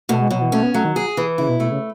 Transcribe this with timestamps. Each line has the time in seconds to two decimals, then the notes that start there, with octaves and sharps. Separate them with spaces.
0.09 B2 A3
0.20 G#3
0.30 B2 F#3
0.41 E3
0.52 A3 C#4
0.63 B3
0.74 F#3 A3
0.85 D#3
0.96 G#4
1.17 E3
1.38 C#3 E4
1.49 B2
1.60 B2 A3
1.71 C#3